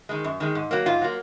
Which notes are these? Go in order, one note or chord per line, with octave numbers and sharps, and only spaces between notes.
D#3 G#3
F#2
D#3 G#3
G#2
F#3 A#3
G#2 F4
F#3 A#3